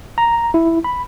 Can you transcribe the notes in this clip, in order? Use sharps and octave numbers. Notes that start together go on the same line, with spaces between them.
A#5
E4
B5